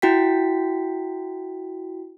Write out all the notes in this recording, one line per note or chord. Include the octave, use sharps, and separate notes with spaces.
E4 F#4 G5 B6